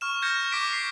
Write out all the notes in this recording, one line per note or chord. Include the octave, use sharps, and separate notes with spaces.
C#6 F6 E7
F6 G6 G#6 A#6 C#7 E7
F6
C#6 D6 F6 B6 D7 E7
C7